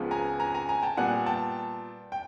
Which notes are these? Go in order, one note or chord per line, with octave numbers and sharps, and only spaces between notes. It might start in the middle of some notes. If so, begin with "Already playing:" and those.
Already playing: C#2 C#3 F3 G#3 B3
G#5 A#5
G#5 A#5
G#5 A#5
G#5 A#5
G5 A5
A#2 G3 B3 F#5 G#5
G5 A5
G5